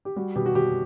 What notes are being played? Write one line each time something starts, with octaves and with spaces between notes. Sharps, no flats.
G4
G3 F#4
B2 G4
F#4
B2 G4